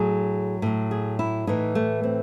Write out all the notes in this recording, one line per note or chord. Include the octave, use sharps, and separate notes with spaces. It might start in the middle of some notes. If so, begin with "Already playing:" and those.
Already playing: A2 F#3 G#4
A2 F#3
G#4
E4
A2 E3 D#4
A3
C4